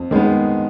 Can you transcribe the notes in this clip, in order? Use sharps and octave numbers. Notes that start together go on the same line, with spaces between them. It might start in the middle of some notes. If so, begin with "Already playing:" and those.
Already playing: F2
D#3 G#3 B3